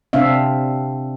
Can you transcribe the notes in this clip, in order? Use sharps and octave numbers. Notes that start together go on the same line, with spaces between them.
C3 C4 D4 E5 F5